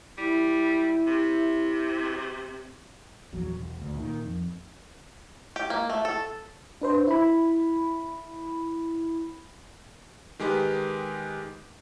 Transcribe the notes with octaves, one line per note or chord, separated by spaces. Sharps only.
G3 E4
C3
A#1 E2 F#3
E1
D2
A#2 D#3
F2
G4
A#3
A3
A4
D4 B4 C5
E4 B5
D#3 G#3 G4 B4